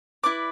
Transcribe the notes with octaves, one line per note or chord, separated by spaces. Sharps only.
E4 B4 D5 D6